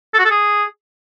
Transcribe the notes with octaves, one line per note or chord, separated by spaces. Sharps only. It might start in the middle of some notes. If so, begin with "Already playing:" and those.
A4
F#4
A4
G#4